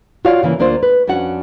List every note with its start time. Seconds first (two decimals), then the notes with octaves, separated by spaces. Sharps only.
0.25 F4 F#4 C#5 D5 F5
0.43 C#3 E3 A#3
0.59 D2 A#3 D4 F4 C5
0.83 B4
1.07 F2 C#4 D4 F#4 F#5